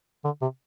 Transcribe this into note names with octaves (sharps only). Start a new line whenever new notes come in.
D3
C3